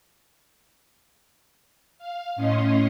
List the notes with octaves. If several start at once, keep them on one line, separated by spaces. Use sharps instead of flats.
F5
A2 C#4 D#5 C6